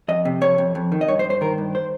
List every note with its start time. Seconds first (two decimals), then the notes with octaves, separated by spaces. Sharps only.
0.08 F2 D#5
0.25 C3
0.41 F2 C#5
0.58 F2
0.75 F2
0.92 D#3
1.01 D#5
1.08 G2 C#5
1.19 C5
1.24 G2
1.30 C5
1.41 D#3 A#4
1.58 G2
1.75 C5